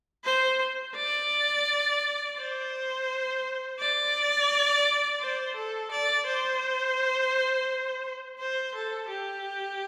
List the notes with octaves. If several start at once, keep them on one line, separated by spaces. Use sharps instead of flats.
C5
D5
C5
D5
C5
A4
D5
C5
C5
A4
G4